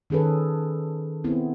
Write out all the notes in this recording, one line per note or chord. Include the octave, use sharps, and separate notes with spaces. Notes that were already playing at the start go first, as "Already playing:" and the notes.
D#3 C#4 G#4 A4 B4
B3 C4 E4